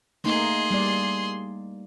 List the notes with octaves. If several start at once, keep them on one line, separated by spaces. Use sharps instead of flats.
A3 A#3 D#4 G#4 C6
G3 A#3 D5